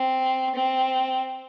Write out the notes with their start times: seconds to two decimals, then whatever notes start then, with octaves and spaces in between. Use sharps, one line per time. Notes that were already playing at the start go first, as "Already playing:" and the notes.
Already playing: C4
0.55 C4